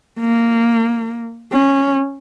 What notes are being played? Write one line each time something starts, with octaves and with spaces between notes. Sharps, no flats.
A#3
C#4